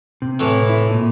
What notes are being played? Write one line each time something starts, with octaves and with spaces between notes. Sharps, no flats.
C3
A2 E3
E4
A#2